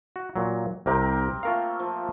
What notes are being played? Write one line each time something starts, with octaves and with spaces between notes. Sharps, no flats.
F#4
A#2 F#3
C2 C3 C4 G4 A#4 G5
A3 A#3 F4 A#4 F5
F3